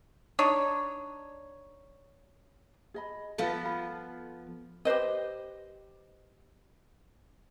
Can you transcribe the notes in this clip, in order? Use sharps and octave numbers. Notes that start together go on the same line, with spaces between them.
D4 D#4 C#5
G#4 D#5 B5
F3 B3 F4 A4 B4 F5
B5
G4 B4 C5 D#5